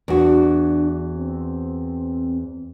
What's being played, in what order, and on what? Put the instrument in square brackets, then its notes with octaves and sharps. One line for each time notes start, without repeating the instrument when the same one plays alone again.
[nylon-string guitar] E2 F#4 [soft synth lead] D4
[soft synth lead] C4